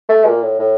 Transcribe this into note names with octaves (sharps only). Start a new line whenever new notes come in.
A3
A#2
A2
A2